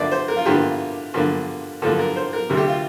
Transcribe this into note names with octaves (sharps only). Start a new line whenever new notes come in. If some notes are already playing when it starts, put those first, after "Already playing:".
Already playing: G2 D3 F3 A#3 D5 E5
C5
A#4
F4
G2 D3 F3 A#3 G4
G2 D3 F3 A#3
G2 D3 F3 A#3 A4
A#4
C5
A#4
D2 C3 G3
G4
F4